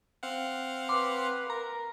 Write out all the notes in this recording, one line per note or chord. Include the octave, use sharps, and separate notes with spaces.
C4 F5 F#5
B4 C6 D6
A#4 A#5